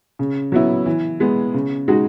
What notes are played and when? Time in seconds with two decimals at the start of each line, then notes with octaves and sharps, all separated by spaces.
0.19 C#3
0.52 F#3 B3 E4
0.86 E3
1.20 G#3 B3
1.54 C#3
1.88 G#3 D#4 F#4